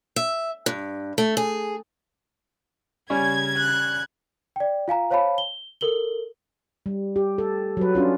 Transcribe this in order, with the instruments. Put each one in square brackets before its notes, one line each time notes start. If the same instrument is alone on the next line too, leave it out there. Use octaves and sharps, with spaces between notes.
[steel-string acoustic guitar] E5
G2
A3
G#4
[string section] C#3 G#6 [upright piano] G3 C#4
[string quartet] F#6
[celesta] D5 G5
F4 F5 G#5 A#5
C5 C#5 F5 A5 B5
G7
A4 A#4 F#7 G7
[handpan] G3
G4
A4
F#3 B4
C#4 D4 F4